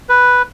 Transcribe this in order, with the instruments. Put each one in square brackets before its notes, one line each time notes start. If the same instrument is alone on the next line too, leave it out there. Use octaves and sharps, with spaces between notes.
[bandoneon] B4